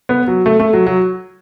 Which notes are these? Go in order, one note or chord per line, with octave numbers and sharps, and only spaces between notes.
B3
F#3
A3
A3
F#3
F#3